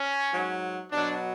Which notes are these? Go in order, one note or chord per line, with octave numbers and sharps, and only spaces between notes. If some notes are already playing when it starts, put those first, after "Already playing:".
Already playing: C#4
G#2 F#3
B2 F#3 D4